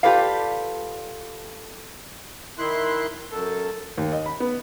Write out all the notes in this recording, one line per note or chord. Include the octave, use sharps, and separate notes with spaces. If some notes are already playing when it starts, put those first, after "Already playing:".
F4 G4 A4 B4 D5 F5
D#3 E4 C6 F#6
F#2 A4
D#2
D#5
B5
B3